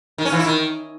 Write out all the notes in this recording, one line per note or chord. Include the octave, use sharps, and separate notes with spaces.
D#3
C#4
E3
E4
D#3